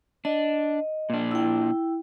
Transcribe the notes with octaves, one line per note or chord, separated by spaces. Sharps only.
D4 D#5
A#2 D4
E4 G5